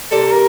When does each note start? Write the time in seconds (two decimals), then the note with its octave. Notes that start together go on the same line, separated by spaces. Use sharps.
0.11 C3 G3 A#3 A4
0.32 A#4